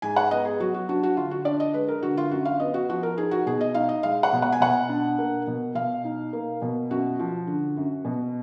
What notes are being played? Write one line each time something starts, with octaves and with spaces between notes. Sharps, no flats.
G#2 G#5
F#5
B3 D#5
G#4
F#3 F#4
F#4
D4 F#4
F#4
D3 F4
F#4
D4 D5
D#5
G#3 B4
A#4
D3 F#4
F4
F#2 F#4
F5
B3 D#5
F#4
F3 F#4
A#4
D#4 G#4
F#4
B2 G#4
D#5
D#4 F5
D#5
G#3 F5
F#5
B2
F#5
G#5
B2 F#5
D4
A#3
B2
B2 F5
D#4
A#3
B2
F#2 F#4
F3
D3
F#2
B2